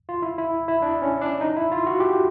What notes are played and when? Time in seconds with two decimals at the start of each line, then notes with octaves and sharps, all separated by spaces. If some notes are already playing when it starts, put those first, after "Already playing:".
0.09 F4
0.22 E4
0.38 E4
0.68 E4
0.82 D4
1.02 C#4
1.22 D4
1.41 D#4
1.57 E4
1.72 F4
1.87 F#4
2.00 G4